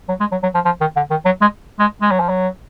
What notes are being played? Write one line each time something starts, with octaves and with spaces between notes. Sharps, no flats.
F#3
G#3
F#3
F#3
F3
F3
D#3
D3
D#3
F#3
G#3
G#3
G#3
F#3
F3
F#3